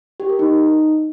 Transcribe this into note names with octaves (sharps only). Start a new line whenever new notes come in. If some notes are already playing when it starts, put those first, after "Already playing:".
G4
A#4
D#4